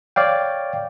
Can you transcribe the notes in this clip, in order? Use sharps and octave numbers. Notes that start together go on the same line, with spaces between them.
C#5 D5 F5 G5